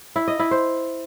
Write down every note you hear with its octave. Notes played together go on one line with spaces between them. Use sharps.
E4
D#5
E4
C5